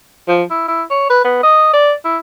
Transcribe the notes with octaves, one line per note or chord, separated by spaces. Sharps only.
F3
E4
E4
C#5
B4
B3
D#5
D5
E4